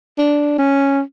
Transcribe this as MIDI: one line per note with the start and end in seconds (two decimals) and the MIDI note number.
0.18 0.56 62
0.58 1.01 61